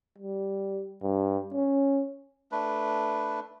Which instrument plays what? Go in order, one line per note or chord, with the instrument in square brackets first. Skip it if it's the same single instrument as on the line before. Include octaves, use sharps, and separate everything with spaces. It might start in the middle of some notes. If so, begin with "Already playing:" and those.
[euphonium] G3
G2
C#4
[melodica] A3 D4 B4